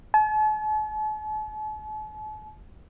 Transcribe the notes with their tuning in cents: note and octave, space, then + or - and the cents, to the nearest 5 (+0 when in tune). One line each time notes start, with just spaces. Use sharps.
A5 -45